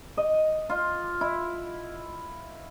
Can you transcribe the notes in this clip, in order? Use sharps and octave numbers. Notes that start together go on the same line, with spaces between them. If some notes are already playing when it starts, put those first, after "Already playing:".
D#5
F4
E4